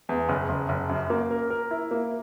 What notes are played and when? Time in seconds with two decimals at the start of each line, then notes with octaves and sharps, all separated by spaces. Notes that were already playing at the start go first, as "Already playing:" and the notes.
0.09 E2
0.29 F#1
0.49 F#1
0.69 F#1
0.89 F#2
1.10 A#3
1.31 A#4
1.50 A#4
1.71 E4
1.91 A#3